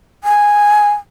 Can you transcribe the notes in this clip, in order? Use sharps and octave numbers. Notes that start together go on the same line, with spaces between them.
G#5